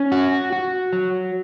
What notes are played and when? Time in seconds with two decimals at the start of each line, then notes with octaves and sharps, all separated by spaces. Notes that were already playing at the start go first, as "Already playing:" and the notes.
Already playing: C#4
0.12 F#4
0.53 F#4
0.93 F#3